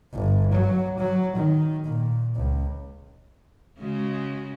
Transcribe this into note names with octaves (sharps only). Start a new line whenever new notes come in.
G1
F#3
F#3
D#3
A#2
C#2
C#3 G#3 F#4